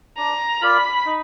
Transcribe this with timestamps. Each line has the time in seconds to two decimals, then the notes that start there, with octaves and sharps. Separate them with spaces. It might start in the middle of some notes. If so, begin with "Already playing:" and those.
0.17 D4 A#5
0.62 F4 A#4 D5 B5
1.06 D#4